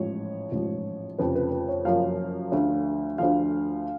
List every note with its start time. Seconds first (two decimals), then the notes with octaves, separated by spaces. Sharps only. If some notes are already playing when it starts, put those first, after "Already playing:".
Already playing: A1 G#2 F3 C#5
0.52 A1 G#2 F3
1.18 F1 F2 C#3 F3 B4
1.35 B4
1.52 B4
1.68 C#5
1.85 F#1 F#2 F3 F5
2.52 D2 D3 F3
3.18 D2 D3 F3 F5